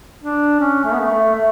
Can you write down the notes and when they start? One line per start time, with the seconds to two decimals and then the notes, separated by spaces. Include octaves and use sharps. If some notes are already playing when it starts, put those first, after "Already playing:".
0.22 D4
0.60 C#4
0.85 A3
0.92 B3
0.99 A3
1.10 A3
1.34 A3